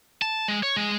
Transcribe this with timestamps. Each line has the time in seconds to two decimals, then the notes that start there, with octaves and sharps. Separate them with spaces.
0.22 A5
0.48 G#3
0.63 C#5
0.77 G#3